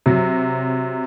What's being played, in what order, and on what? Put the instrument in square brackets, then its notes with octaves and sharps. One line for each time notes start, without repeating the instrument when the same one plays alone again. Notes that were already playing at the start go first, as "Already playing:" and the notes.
[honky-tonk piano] C3 F#3